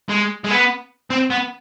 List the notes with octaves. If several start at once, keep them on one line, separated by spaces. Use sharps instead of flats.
G#3
G#3
B3
C4
B3